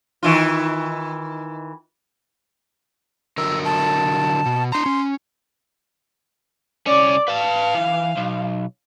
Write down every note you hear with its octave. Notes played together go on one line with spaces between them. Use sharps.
D#3 E3 F4
D3 F#3 A#4 E6
A5
B2
D4 A#5 C6
C#4
C2 C#4 D5
B4 F5 A5
E3
B1